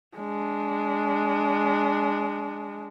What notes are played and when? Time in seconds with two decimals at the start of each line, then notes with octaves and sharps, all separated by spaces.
0.17 G#3 D4